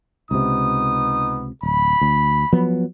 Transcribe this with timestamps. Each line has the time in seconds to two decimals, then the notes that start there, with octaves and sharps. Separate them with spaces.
0.31 C#2 C3 B3 D#4 D#6
1.63 D1 B5
2.01 D2
2.53 F3 F#3 B3